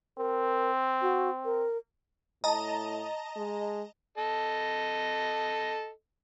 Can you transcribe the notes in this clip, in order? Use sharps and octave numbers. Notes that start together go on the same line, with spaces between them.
C4 A#4
F#4
A#4
A2 D#5 A5 A#5
G#3
A4 D#5